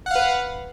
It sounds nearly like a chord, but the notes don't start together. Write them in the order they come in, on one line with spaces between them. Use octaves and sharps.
F#5 F5 B4